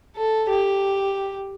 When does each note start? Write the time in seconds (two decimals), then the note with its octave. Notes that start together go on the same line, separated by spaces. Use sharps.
0.16 A4
0.49 G4